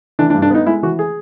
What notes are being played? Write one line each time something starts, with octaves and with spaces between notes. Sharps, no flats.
E3 D4
D4
G2
D4
B3 D#4
G#3 E4
E3 F#4
G#4